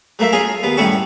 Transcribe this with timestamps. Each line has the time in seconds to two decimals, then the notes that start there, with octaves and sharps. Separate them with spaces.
0.19 F#3 A3 A#3 A#4 E5
0.33 C#4 F4 G#4 A#4
0.63 D#2 B3
0.77 F#2 A2 G3 C#4 A4 C#6